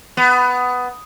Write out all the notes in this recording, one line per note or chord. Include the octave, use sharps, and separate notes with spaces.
B3